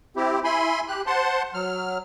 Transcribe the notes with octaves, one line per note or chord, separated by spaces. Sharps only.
C4 E4 G4
E4 G#5 B5 C6
G4 F#6
C5 F#5 A5 C6
F#3 F6